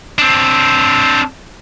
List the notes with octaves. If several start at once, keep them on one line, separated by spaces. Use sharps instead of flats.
C4 D4